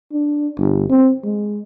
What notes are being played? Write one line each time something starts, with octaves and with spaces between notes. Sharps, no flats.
D4
G1
C4
G#3